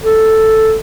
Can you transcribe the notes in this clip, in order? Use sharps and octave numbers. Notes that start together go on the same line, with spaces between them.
A4